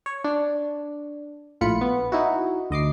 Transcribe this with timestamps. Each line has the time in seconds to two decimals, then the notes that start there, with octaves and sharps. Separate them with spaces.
0.06 C#5
0.24 D4
1.61 A#1 A2 F4 B5 C#7
1.81 B3
2.12 D#4 E4 F#4
2.70 D2 D#5 D6 C7